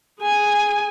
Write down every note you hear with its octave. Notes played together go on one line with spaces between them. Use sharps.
G#4 G#5